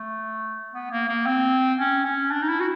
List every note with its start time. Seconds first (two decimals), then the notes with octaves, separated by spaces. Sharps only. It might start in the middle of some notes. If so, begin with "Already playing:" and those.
Already playing: A3
0.73 B3
0.91 A#3
1.09 A#3
1.26 C4
1.79 C#4
2.05 C#4
2.31 D4
2.42 D#4
2.49 E4
2.60 F#4